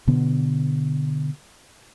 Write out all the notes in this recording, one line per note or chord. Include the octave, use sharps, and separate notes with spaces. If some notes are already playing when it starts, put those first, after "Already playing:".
B2 D3 B3